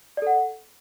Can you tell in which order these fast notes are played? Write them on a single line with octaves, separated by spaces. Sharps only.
D5 A4 F#5